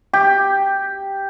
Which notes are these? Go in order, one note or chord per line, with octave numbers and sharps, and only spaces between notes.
G4